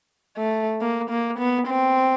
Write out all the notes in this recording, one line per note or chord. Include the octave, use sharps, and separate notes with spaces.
A3
A#3
A#3
B3
C4